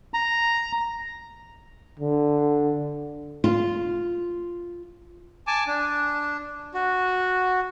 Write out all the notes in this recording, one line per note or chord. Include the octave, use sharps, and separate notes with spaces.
A#5
D3
F4
G#5 A5 D6
D4
F#4